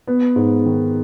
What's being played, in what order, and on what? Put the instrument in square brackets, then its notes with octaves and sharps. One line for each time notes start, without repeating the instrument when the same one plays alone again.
[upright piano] B3
G#2
D#3